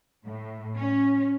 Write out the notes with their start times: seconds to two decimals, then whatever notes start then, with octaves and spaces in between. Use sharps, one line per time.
0.25 A2
0.77 C#4